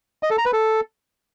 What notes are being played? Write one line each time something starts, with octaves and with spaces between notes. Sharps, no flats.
D#5
A4
A#5
B4
A4